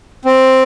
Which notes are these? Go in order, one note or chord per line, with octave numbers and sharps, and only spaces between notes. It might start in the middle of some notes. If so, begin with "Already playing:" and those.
C4